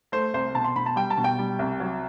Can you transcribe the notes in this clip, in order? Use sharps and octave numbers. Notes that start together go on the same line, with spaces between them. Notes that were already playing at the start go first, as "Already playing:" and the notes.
A3 C5
C2 C5
B2 A5
C6
B2 B5
A5
G3 G5
A5
B2
G5
G3
C2
F#3